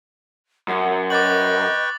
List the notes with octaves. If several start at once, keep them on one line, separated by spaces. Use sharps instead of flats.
F#2 F#5
B4 D#5 G5 C#6 D6 A6 F#7